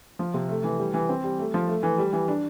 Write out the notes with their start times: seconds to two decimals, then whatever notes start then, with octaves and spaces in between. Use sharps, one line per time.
0.19 F3
0.34 C3
0.49 A3
0.64 E3
0.79 G3
0.94 E3
1.09 C4
1.24 G3
1.39 A3
1.54 F3
1.68 A3
1.83 E3
1.98 G3
2.13 E3
2.28 D4